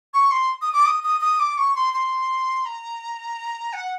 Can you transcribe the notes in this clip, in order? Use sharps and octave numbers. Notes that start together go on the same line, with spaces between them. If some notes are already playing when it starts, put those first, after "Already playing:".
C#6
C6
D#6
D6
D#6
D#6
D#6
D6
C#6
C6
C6
A#5
F#5